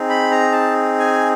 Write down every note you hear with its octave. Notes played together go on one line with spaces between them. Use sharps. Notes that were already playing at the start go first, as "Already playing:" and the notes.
Already playing: C4 D#4 G#4
B5
A#5
A5
G#5